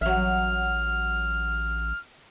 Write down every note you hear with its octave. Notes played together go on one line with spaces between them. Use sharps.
A1 F#3 E5 F6